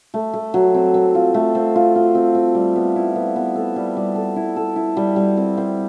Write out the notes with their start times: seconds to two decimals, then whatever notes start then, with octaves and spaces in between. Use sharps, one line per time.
0.14 A3
0.34 A3
0.54 F#3
0.74 C4
0.94 C4
1.15 F4
1.34 A3
1.55 C4
1.75 F4
1.95 F4
2.15 C4
2.35 C4
2.55 G3
2.76 B3
2.96 E4
3.16 B3
3.36 B3
3.56 A4
3.76 G3
3.97 G3
4.16 A4
4.36 E4
4.56 A4
4.76 E4
4.97 G3
5.16 G3
5.37 C4
5.57 C4